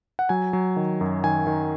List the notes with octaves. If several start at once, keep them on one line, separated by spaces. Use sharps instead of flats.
F#5
F#3 G#5
F#3
D#3
F#2
D#3 G#5
D#3